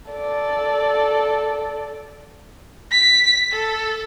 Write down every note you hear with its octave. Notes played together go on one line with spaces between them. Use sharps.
A4 D5
B6
A4